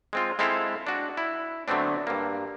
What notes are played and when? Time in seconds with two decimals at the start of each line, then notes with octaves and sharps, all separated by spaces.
0.13 G#3 C4 F4
0.39 G#3 C4 E4 A4 F5
0.87 D4 F#4
1.17 E4
1.68 D3 F#3 A3 B3 C4 D4
2.07 G2 A#3